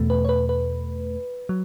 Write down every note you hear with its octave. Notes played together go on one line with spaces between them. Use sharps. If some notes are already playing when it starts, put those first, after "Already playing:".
Already playing: E2 B2 A3
B4
C#5
B4
B4
F#3